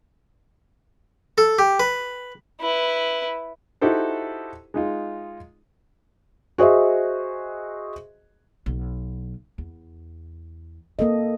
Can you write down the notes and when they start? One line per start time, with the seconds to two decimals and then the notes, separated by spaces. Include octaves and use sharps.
1.38 A4
1.59 G4
1.80 B4
2.61 E4 B4
3.81 D#4 E4 F#4 G4 A4 C5
4.74 G#3 D#4 F4
6.58 F#4 G#4 C5 D#5 E5
8.66 B1 B3
9.58 E2
10.99 A#3 C4 A4 D#5